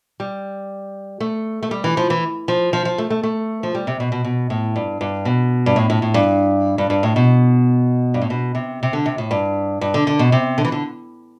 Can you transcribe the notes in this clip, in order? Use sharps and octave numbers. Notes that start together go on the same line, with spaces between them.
G3
A3
A3
G3
E3
F3
E3
F3
F3
F3
A3
A3
A3
F3
G3
C3
B2
B2
B2
A2
G2
G2
B2
G2
A2
A2
A2
G2
G2
G2
A2
B2
G2
A2
B2
C3
C3
D3
C3
A2
G2
G2
D3
D3
B2
C3
D3
E3
D3